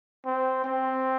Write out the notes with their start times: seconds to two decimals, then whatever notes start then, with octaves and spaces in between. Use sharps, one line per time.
0.26 C4
0.64 C4